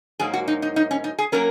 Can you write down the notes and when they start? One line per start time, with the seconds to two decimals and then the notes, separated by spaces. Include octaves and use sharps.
0.19 G#2 F#3 A#3 G#4
0.34 F#4
0.48 D#4
0.62 D#4
0.76 D#4
0.91 C#4
1.04 D#4
1.19 G#4
1.32 F#3 A#3 C#4 A#4